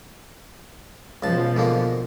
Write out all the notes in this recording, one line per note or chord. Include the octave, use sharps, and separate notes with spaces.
C#2 B2 F3 A5
G#2 D3 A#3